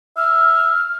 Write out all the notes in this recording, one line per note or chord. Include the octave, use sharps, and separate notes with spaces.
E5 F6